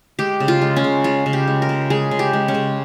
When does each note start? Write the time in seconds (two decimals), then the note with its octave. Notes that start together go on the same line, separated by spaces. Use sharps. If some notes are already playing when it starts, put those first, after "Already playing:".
0.19 G#3 G4
0.40 C#3
0.48 F4
0.62 G#3
0.76 C#4
0.84 C#3
1.04 G#3 F4
1.26 C#3
1.33 G4
1.47 G#3
1.62 A#4
1.69 C#3
1.90 G#3 G#4
2.11 C#3
2.19 G4
2.33 G#3
2.48 C#4
2.54 C#3